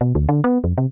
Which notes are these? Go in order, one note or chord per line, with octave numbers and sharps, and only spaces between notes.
B2
D2
D3
B3
F2
C3